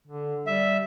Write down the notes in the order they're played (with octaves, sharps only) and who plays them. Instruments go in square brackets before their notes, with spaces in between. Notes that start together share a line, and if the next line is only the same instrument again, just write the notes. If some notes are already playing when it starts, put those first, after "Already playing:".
[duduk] D3
[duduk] G3 [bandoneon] E5